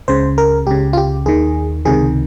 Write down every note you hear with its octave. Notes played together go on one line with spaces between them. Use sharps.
C#2 C#3 C5
A#4
C#2 C#3 G4
F4
G4
D#2 D#3 G#4
C#2 C3 D#3 G#4